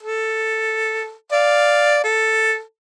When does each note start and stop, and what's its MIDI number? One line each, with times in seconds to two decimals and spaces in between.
0.03 1.13 69
1.32 2.03 74
1.32 2.03 77
2.04 2.61 69